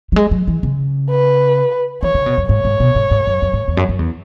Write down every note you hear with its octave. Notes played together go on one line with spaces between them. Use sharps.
F#3
G#3
F#3
E3
C#3
B4
E3 C#5
C#3
B2
F#2
G#2 C#5
G#2
B2
G#2
G#2
F#2
F#2
G#2
E2
F#2
F#2
E2